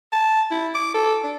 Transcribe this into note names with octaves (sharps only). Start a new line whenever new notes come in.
A5
E4
D6
A4
D4